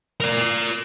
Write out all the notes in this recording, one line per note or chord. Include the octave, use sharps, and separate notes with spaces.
A#4 D5